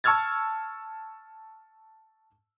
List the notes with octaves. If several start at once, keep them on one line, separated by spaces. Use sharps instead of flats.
A5 C#6 E6 F6 G#6 A6